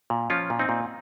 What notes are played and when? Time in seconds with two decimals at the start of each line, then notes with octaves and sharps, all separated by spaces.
0.10 A#2
0.30 F3 C#4 F4
0.50 A#2
0.59 C4 D#4
0.69 A#2